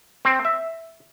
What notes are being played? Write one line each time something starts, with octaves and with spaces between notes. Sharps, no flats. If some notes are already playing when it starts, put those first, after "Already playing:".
C4
E5